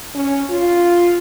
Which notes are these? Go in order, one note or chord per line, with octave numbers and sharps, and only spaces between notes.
C#4
F4